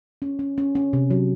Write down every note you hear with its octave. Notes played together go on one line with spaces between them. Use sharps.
C#4
C#4
C#4
C#4
C3
F#3